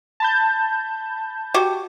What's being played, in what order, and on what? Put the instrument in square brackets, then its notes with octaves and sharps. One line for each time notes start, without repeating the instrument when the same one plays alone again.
[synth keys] A5 B5 G6
[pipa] F#4 G4